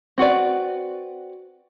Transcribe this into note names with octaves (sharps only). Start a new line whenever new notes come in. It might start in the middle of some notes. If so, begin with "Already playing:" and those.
C4 F#4 B4 D5